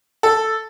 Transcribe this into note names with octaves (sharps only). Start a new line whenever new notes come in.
A4